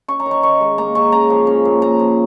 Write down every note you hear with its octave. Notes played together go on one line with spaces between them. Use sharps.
C#4 C#6
A#5
D#3
C#6
D#3 C#6
G#3
A#3 A#5
C#3 C#6
C#3 A#5
F3
C#4
A#2
A#2 A#5
F3